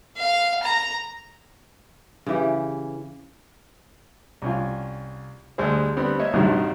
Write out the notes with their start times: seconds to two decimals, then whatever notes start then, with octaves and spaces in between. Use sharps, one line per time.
0.17 F5
0.63 A#5
2.26 C#3 E3 G4
4.42 C2 C#4 F4
5.58 D2 G3 G#3 G#4 C5
5.96 D3 G3 B3 C4
6.19 A#3 C#5 D#5 E5
6.34 A#1 G2 C3 D#3 F3 F#3